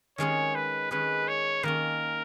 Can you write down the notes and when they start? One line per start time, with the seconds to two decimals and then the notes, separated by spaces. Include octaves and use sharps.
0.18 D#3 G#3 C#4 G#4 C#5
0.55 B4
0.91 D#3 G#3 C#4 G#4 B4
1.28 C#5
1.63 D#3 A#3 C#4 A#4